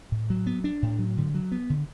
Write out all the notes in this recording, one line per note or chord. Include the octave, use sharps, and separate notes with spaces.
A2
F#3
B3
D4
A2
F#3
D3
F#3
B3
D3